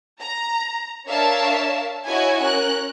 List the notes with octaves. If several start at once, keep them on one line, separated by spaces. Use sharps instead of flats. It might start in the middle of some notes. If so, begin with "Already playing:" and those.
A#5
D4 A#4 C#5 E5 F5 A5
E4 F#4 C#5 D#5 G#5
C#4 A#4 F#6